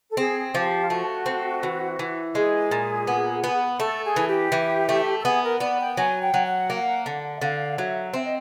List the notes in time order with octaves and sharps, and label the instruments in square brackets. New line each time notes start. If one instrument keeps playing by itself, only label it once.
[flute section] A4
[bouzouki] C4 [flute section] G#4
[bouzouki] F3 [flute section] G4
[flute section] F4
[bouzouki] A3 [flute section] F#4
[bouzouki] C4
E3
E3
[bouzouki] G#3 [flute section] G#4
[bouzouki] A#2
B3
B3
[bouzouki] A3 [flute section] A4
[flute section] G#4
[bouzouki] E3
[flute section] G4
[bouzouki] E3
A3
[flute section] A4
[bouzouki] B3 [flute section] G#4
[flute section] A#4
[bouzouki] B3 [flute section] D5
[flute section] G5
[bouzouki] F#3 [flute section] G#5
[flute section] G5
[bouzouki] F#3
[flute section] F#5
[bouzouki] A#3
D3
[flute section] E5
[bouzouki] D3 [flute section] F5
[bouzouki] F#3 [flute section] E5
[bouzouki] C4 [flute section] E5
[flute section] D#5